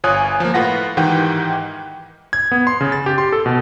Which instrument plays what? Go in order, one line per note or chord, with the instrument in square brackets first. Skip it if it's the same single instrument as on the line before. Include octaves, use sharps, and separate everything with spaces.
[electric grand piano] G1 F4 C#5 G#5 D#6 F#6
F3 A#3
A2 F4 B4 F#5 A#6
G#2 D#3 E3 G4 F#5 G5
G#6
B3
C6
C#3
A6
G4
C6
A4
B2